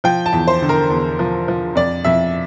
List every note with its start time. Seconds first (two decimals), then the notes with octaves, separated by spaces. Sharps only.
0.04 F3 G5
0.26 A5
0.33 E2
0.47 C5
0.62 D3
0.69 A#4
0.90 E2
1.19 F3
1.48 F3
1.76 F2 D5
2.05 F2 E5